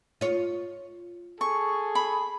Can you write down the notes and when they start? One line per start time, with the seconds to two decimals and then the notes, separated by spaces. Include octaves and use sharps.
0.21 F4 C#5
1.41 G#4 A4 C#6
1.95 B5